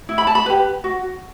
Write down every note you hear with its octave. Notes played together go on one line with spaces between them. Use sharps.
E4
B5
A5
B5
G4 B4
F#4